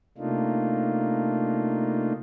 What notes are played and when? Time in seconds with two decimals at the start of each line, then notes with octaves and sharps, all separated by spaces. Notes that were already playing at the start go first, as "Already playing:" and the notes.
0.18 C3 A3 A#3 D4 D#4 F4